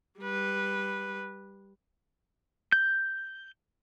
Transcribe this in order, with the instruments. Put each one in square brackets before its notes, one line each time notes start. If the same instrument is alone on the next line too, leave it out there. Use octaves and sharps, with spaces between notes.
[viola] G3 B4
[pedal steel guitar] G6